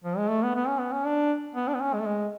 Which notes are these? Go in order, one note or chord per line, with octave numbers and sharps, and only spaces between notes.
F3
G#3
A3
B3
B3
C#4
B3
C#4
D4
B3
D4
B3
C#4
G#3
A3
G#3